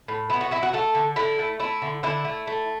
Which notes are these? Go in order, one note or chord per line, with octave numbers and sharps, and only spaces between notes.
A2
B3 E4
F#4
F#3 E4
F#4
A3 A4
D3
D3 E4
A3
A3 E4
D3
D3 E4
A3
A3